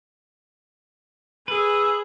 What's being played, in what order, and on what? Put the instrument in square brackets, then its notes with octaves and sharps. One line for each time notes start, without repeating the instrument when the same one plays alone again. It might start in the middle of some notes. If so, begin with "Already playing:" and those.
[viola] G#4 [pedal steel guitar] B4 [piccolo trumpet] E6